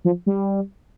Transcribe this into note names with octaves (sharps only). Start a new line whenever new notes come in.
F3
G3